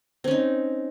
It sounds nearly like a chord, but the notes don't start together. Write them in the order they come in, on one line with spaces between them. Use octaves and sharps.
C4 C#4 D#4